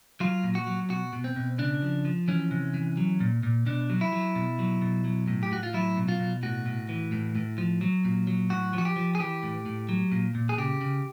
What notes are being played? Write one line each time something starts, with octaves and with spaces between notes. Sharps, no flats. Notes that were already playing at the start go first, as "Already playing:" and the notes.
F#3 F4
A#2
F#4
F#3
B2 F#4
B2
C4
B2
C#3 D4
F3
F3
E3 C#4
C3
E3
F#3
A#2
A#2
B2 D4
F#3
E4
F#3
B2
F#3
B2
F#3
A2
G4
A2 F#4
F4
F#3 E4
B2
F4
B2
A2 F#4
A2
E3
A2
A2
F3
F#3
A#2
F#3
A2 F#4
F3 F#4
G4
F3
G#4
E3 G4
A2
A2
F#3
A#2
A#2
G#4
C#3 G4
C#3